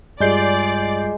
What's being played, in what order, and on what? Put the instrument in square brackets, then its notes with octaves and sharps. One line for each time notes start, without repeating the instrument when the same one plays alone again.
[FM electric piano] G2 G6 C7 [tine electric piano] G3 F4 [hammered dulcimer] G#3 [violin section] D5